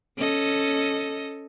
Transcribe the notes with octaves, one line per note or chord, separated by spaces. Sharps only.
C#4 A4 D#5